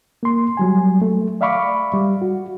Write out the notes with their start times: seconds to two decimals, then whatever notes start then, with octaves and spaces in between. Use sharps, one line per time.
0.23 A#3 C6
0.57 F#3 G3 G#5
1.02 A3
1.41 D5 E5 F5 B5 C#6 D6
1.93 G3
2.22 F#4